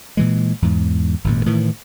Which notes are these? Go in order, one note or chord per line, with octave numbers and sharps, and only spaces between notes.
A#2 E3 G#3
E2 G#2
G#1 F#2 A#2
A2 D#3 E3